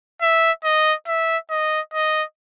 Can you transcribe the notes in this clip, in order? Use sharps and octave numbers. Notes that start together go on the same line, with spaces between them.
E5
D#5
E5
D#5
D#5